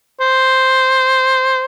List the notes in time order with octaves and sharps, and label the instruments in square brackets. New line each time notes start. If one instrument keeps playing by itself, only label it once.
[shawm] C5